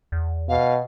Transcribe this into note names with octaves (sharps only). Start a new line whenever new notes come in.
E2
B2 F5